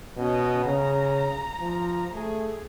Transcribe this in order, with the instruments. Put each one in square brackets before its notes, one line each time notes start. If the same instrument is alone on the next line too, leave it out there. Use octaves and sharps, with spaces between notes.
[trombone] B2 [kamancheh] C#4 D#5
[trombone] C#3 [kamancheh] A#5
[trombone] F3
[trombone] A3 [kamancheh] G#4